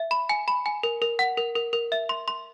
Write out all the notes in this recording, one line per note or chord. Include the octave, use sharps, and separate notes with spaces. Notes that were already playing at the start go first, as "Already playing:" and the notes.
Already playing: E5
B5
G#5
B5
G#5
A#4
A#4
F#5
A#4
A#4
A#4
E5
C6
C6